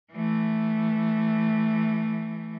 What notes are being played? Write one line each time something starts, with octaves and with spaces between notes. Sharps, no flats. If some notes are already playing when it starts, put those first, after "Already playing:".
E3 A3